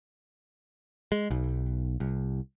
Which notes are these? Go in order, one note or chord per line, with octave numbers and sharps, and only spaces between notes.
G#3
B1
C2